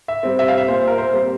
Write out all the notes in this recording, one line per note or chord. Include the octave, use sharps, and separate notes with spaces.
E5
G3 C4
E5
F5
E5
A#2 C5
A#4
C5
G3 C4